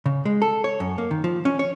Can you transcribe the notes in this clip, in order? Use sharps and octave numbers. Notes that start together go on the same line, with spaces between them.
C#3
G#3
A4
C#5
F#2
A#3
D#3
F3
C#4
C#5